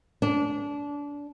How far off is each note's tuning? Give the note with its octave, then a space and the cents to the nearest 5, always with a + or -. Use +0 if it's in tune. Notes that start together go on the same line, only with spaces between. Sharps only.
D4 -25